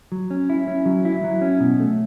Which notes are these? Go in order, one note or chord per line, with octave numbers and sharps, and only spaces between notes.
F#3
C#4
E4
C#4
F#3
E4
F#3
C#4
B2
A3